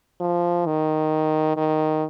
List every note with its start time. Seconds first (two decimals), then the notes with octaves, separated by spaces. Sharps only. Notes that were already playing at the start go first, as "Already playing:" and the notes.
0.20 F3
0.66 D#3
1.56 D#3